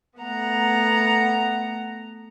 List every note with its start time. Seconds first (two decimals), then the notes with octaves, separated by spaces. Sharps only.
0.18 A3 B3 F#5 A#5